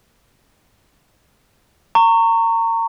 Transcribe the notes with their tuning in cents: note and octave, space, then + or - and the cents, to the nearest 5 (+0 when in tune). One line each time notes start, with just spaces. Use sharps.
A#5 -30 C#6 +0